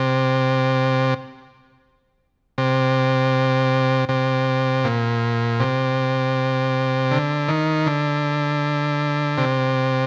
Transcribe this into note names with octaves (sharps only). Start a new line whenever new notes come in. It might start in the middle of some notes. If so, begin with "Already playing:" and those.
Already playing: C3
C3
C3
A#2
C3
D3
D#3
D3
C3